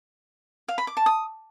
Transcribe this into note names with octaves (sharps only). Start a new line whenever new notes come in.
F5
B5
D6
A5
D#6